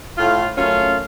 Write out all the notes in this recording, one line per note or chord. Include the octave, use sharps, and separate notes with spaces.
A2 F4
F#2 A3 C#4 F4